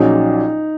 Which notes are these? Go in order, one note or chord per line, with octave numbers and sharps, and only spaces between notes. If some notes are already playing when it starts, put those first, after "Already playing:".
Already playing: A#1 A#2 F#3 C#4 D#4 G#4